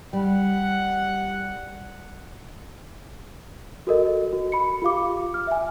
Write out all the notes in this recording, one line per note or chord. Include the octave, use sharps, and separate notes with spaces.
G3 F#5
F#4 A4 A#4 D#5
F#4
B5 C#7
F4 G4 F5 D6
F6
E5 G#5